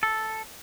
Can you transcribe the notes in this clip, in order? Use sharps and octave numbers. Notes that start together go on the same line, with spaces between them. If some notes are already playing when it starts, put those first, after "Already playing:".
A4